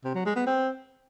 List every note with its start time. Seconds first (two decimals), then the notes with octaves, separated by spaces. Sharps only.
0.04 C3
0.15 F#3
0.25 G#3
0.36 B3
0.46 C4